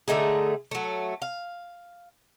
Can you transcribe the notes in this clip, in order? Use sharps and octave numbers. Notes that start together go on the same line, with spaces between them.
D3 A3 D#4 G#4
F#3 A3
F5